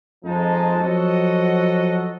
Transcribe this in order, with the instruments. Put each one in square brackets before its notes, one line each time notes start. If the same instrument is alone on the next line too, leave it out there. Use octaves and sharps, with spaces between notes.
[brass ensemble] F2 F3 G#3 D#4 A5
F3 F#3 F#4 A4 D#5